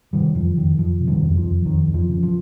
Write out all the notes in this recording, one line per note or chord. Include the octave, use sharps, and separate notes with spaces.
C3 D#3 G3
F2 F3
F2 D#3
F2 F3
C3
D#3 G3
F2
F3
F2
F2 D#3
F2
F3
C#3
F3